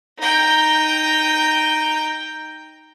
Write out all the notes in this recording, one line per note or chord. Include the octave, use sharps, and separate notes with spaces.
D#4 G5